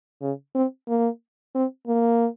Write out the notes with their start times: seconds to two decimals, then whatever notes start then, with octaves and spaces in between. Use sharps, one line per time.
0.22 C#3
0.55 C4
0.88 A#3
1.55 C4
1.87 A#3